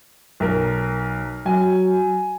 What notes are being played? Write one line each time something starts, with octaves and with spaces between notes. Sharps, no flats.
B1 A#4
F#3 G#5